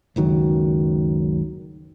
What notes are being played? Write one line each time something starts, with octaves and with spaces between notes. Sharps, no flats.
F#1 C#2 D#3 F#3